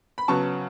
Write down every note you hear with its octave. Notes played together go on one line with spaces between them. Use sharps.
B5
C#3 F#3 B3 A5 C#6